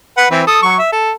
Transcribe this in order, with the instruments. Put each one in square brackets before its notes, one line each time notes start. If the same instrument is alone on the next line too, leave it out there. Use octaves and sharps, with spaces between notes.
[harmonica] B4 F#5
E3 C4 B4
A4 D#6
F#3 C#6
E5
A4